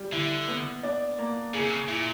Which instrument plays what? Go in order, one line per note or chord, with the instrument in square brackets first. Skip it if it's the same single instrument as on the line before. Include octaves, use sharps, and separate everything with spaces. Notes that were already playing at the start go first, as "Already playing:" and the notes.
Already playing: [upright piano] G3
[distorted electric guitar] D3 [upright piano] E4
[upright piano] B3
D4
A#3
[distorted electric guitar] C#3 [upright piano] G#4
[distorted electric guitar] C3
C#3
[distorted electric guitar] A#2 [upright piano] E4